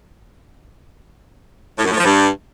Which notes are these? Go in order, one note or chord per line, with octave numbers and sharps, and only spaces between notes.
A2
F#2
A2
F3
G2